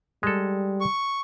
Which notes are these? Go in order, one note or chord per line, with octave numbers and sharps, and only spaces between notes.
G3 G#3 A4
C#6